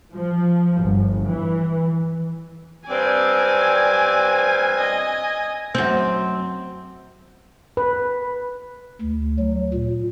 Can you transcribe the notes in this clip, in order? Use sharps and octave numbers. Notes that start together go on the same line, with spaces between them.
F3
G1
E3
G2 C4 D5 G#5
D#5
F#2 C4
B4
D2
F#3
A#2